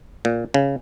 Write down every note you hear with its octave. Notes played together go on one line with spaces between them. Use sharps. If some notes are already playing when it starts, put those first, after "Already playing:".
A#2
C#3